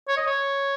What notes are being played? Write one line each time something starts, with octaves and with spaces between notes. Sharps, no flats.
C#5
D#5
C#5